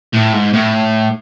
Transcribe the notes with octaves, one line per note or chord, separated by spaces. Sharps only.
A2
G#2
A2